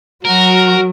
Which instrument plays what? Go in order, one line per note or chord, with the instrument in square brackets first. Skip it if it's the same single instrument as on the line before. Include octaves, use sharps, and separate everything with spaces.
[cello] F#3 [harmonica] F#4 [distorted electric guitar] A#4